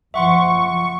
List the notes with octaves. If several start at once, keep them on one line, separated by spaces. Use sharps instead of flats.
F#1 F3 E5 F#5 C6 C#6